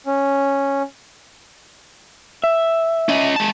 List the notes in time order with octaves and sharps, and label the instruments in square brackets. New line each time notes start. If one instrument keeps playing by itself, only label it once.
[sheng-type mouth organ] C#4
[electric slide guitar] E5
[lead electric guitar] C#4 D#5
G#3 A5